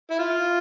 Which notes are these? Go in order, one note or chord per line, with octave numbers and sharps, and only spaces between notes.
E4
F4